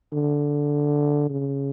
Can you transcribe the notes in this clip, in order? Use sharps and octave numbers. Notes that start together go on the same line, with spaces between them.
D3
C#3